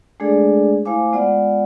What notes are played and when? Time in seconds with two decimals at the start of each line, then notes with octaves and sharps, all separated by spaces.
0.20 G#3 A3 D4 G#4 A4 D5
0.85 A3 E4 C5 F5 G#5 D6
1.13 G#3 B3 F4 D5 F#5